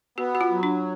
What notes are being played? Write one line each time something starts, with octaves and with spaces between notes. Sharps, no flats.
B3 F#4
F#4
F4
F#3
D4